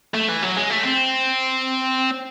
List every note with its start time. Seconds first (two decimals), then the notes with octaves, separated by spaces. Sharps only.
0.14 A3
0.28 E3
0.42 F#3
0.57 G#3
0.70 A3
0.83 C4